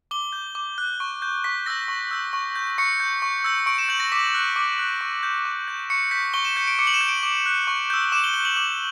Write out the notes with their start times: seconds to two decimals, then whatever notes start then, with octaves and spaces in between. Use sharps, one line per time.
0.11 D6 G7
0.33 G6
0.55 D6
0.78 F#6
1.00 C#6
1.22 G6
1.44 C#6 B6
1.66 E6 G6 A#6
1.88 C#6
2.11 E6 G6
2.33 C#6
2.55 G6
2.78 C#6 C#7
3.00 G6
3.22 C#6
3.44 E6 G6
3.66 C#6 D7
3.78 E7
3.89 G6 F#7
4.00 A#6
4.12 D6 B6
4.34 F#6
4.56 D6
4.79 F#6
5.01 C#6
5.23 G6
5.45 D6
5.68 G6
5.90 C#6 C#7
6.11 G6 B6
6.34 C#6 G7
6.45 E7
6.56 G6 C#7
6.68 D7
6.79 D6 C#7
6.87 F#7
6.94 E7
7.01 G6
7.08 D7
7.23 D6
7.46 F#6
7.67 C#6
7.90 E6 G6
8.12 D6 E7
8.24 G7
8.34 F#6 G7
8.45 F#7
8.56 D6 F#7